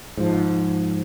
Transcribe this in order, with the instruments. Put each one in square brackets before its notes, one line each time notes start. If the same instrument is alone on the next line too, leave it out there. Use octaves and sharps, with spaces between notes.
[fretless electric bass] G#2 F3